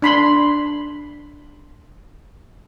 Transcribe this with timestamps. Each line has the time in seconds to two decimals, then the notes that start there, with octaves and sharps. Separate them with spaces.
0.02 D4 B5 C6